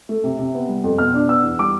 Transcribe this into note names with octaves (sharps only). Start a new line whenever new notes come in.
A3
C3
C3
B3
G3
F2
B2 F6
D4
B3 E6
E2
G3 D6